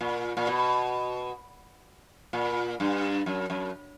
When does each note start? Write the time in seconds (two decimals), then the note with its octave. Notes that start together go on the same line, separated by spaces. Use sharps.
0.01 A#2
0.37 A#2
0.47 B2
2.33 A#2
2.80 G2
3.26 F#2
3.50 F#2